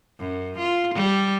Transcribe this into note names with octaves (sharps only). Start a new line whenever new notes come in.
F#2
F4
G3